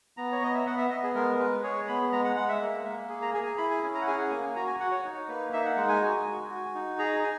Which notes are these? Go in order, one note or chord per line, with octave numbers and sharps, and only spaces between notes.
B3 A#5
C#5
B3 D#5
E5
B3 F#5
E5
B3 D#5
G#4
G#3 A#4
G#3 B4
G#4 C#5
B3 B5
G#3 A#5
F#5
G#3 F#5
E5
A#3
A#3
G#4
A#5
G#4 G#5
G#5
E4 B5
G#5
C#4
A#5
F#5
G#4 G#5
F#5
A#3 G#5
F#4 A#5
G#5
F#4 F#5
C#5
D#4
A#3 B4
D#4 E5
F#5
G#3 F#5
G#5
F#4
F#4
F#4
D#4
G#4 A#5
G#5